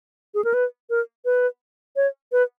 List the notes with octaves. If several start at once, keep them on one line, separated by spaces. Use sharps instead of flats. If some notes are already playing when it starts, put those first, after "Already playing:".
G#4
A#4
B4
A#4
B4
C#5
B4